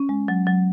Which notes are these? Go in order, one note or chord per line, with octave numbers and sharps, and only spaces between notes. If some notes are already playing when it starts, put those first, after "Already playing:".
Already playing: C#4
G#3
F#3
F#3